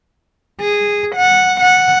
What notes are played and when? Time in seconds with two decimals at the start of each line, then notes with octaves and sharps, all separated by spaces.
0.60 G#4
1.16 F#5
1.61 F#5